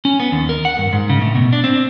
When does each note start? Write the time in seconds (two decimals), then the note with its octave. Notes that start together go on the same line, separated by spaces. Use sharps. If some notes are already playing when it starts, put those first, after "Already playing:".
0.05 C#4
0.20 B3
0.32 D#2
0.49 A#4
0.65 F#5
0.78 G2
0.93 G#2
1.10 C#3
1.21 A2
1.35 B2
1.53 D4
1.64 C4